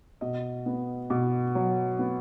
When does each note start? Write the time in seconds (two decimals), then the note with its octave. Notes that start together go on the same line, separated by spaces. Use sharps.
0.21 B2 D#5
0.66 B3
1.10 B2
1.55 F#3
1.99 B3